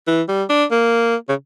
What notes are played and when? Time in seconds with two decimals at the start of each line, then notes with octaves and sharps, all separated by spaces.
0.07 E3
0.28 G3
0.50 D4
0.71 A#3
1.29 C#3